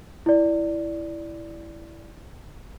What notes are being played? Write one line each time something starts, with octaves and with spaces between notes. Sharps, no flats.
E4 D5